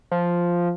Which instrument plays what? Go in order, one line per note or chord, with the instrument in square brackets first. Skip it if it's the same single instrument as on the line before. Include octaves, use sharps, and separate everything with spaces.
[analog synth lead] F3